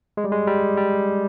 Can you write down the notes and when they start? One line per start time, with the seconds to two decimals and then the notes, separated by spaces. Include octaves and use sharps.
0.17 G#3
0.24 G3
0.32 G#3
0.47 G3
0.77 G3